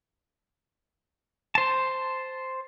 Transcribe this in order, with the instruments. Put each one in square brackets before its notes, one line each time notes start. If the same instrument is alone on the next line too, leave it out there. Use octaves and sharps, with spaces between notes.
[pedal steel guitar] C5 A5